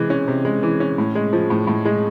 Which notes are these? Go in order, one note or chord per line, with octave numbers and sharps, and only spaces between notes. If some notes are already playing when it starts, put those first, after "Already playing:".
Already playing: C3 E3 G#3
C#4
C3
G#3
E3
C#4
A2
G#3
F3
A2
A2
G#3